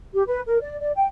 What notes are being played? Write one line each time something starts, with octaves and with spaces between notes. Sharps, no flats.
G4
B4
A#4
D5
D5
G5